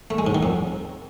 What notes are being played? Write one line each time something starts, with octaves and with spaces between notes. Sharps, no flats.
A3
G#3
G#2
D#3
F2